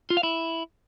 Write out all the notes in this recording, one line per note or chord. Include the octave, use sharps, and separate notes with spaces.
F4
F5
E4